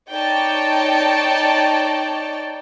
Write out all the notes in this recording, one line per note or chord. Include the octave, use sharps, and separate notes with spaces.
D#4 C#5 D5 G5 A5